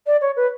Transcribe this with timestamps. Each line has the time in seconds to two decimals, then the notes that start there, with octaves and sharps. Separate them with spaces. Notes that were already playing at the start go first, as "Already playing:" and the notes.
0.07 D5
0.21 C#5
0.36 B4